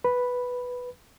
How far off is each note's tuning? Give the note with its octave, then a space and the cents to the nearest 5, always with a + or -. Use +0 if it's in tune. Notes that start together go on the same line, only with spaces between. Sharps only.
B4 +0 B5 +0